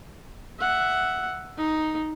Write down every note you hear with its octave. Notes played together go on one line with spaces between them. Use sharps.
E5 F#5
D#4